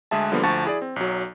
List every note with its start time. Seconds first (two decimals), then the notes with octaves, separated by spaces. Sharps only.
0.11 D2 G#3 G#4 E5 A5
0.32 D3 F3 G3 A#3 B3
0.43 D2 F3 A5 C#6 A6
0.65 E4 G#4 D5
0.82 C4
0.96 B1 F#3